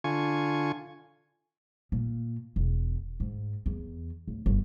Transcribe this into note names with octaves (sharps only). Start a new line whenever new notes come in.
D3 F4 G#5 C#6
A#2
E1
G#2
E2
D1
G1